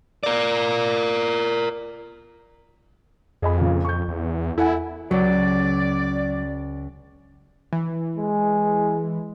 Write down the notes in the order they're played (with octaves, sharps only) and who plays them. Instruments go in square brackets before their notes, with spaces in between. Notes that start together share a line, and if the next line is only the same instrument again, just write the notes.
[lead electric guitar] A#4 D5
[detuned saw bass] F2 [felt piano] G#4 D#5 B5
[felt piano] A#2 C#3
[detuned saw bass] F2 [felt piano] C#6 G6
[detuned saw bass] E2
[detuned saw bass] E4 [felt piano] A4 F#5 G#5
[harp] C#2 [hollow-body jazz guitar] F#3 [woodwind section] D5
[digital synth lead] E3
[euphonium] G#3